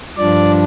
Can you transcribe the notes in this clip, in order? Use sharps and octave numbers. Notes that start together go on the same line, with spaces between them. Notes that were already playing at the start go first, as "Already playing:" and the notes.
G2 F3 D4 D5